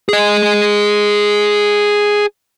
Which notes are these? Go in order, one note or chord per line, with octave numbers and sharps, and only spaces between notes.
G#4 D#5